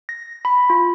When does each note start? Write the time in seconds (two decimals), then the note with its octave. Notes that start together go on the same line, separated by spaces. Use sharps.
0.09 A#6
0.45 B5
0.70 F4